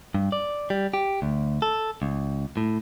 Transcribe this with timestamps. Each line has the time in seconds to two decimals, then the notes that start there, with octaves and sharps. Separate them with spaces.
0.15 G2
0.32 D5
0.70 G3
0.94 G4
1.22 D2
1.62 A4
2.02 C#2
2.57 A2